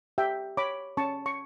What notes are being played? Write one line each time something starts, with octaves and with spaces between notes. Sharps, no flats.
G4 E5 G5
C#5 B5 D6
C#4 A5 C#6
C#6